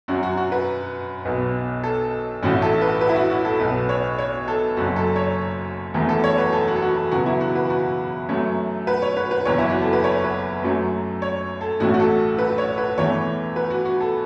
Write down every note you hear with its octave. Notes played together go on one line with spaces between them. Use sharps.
F#2 F#3 C#4 F#4
F#4
F#4
B4
B1 B2 B3
A4
A1 A2 A3 C#4 F#4
A4
B4
B4
E4
F#4
F#4
A4
B1 B2 B3 B4
C#5
C#5
A4
F#1 F#2 F#3 F#4
A4
C#5
E1 E2 E3 A3
A4
C#5
B4
A4
F#4
A4
F#4
A4
E2 C#3 F#3 B3 F#4
E4
F#4
B4
F#4
F#2 F#3 A3 C#4
B4
C#5
B4
B4
F#1 E2 E3 B3 C#5
E4
F#4
A4
B4
C#5
B4
F#2 F#3 A3 C#4
C#5
A4
A1 A2 A3 C#4 F#4
F#4
A4
B4
C#5
B4
E2 E3 A3 C#5
B4
F#4
F#4
A4